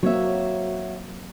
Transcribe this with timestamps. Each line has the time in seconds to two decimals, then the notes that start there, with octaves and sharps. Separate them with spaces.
0.03 F#3 A#3 C4 F#4 C#5 E5